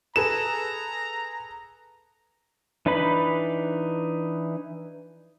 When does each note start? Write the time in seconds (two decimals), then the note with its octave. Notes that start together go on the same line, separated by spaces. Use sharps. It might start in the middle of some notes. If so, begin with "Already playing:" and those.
0.16 G#4 A4 B4 A#5 E7
2.86 E3 D4 D#4 B4 B5